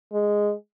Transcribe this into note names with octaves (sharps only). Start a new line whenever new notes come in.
G#3